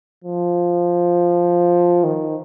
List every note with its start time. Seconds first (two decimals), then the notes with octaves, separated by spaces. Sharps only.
0.25 F3
2.04 D#3